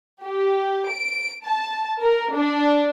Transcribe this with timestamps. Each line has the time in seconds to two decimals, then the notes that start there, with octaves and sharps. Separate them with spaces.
0.24 G4
0.91 D7
1.45 A5
2.01 A#4
2.33 D4